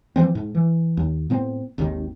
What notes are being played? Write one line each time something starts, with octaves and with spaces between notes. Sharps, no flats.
E3 F3 G#3 C4
G#2
E3
D#2
A2 B3 C4
G#1 D#2 D#3